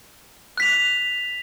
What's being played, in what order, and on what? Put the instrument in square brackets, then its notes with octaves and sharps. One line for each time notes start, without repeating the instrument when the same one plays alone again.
[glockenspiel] F#6 B6 F7